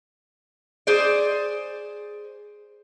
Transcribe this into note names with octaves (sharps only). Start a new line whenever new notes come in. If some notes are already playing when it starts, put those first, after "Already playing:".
G#4 C5 D5